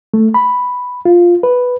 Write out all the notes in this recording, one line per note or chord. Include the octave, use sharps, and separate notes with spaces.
A3
B5
F4
B4